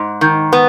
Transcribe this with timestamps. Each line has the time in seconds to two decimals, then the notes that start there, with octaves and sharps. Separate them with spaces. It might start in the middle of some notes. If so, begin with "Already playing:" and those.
Already playing: G#2
0.21 D#3
0.53 B3